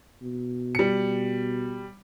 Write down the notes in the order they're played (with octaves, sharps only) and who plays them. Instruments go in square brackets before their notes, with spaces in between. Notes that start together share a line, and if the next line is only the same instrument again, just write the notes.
[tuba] B2
[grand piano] G3 C#7